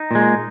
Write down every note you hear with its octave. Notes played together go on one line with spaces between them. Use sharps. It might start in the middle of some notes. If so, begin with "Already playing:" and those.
Already playing: D#4
A#2 G#3